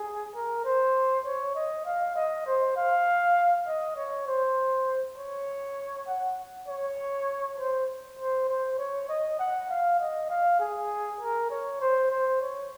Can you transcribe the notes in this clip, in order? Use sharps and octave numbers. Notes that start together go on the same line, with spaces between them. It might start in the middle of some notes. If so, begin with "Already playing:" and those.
Already playing: G#4
A#4
C5
C#5
D#5
F5
D#5
C5
F5
D#5
C#5
C5
C#5
F#5
C#5
C5
C5
C5
C#5
D#5
F#5
F5
D#5
F5
G#4
A#4
C#5
C5
C5
C#5